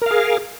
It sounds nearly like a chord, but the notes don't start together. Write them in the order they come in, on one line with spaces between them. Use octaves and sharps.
A#4 F5 G#4